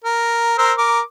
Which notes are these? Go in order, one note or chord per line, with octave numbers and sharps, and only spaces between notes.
A#4
A#4 C5 E6
A#4 D6